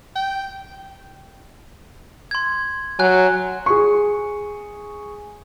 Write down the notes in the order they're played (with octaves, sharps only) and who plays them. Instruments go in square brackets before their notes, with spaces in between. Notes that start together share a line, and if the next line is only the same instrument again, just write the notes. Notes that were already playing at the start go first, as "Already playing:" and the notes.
[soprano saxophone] G5
[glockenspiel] C6 G#6
[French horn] F#3 [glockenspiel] G#5 F#6
[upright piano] G#4 C#6